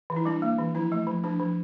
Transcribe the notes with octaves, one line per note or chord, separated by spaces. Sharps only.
E3
E4
G3 D4
A#3
E3
F3 E4
A3
F3
F3 D4
F3